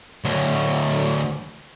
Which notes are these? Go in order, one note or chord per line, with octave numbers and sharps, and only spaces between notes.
D2 F#3